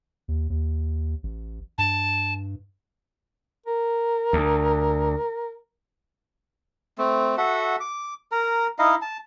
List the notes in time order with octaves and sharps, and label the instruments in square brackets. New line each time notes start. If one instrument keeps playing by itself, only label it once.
[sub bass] D#2
D#2
A1
[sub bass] G2 [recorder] A5
[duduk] A#4
[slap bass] D2
[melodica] A3 C4
F#4 A4 E5 F#5
D6
A#4 A#5
D#4 E4 D#5 F5
A5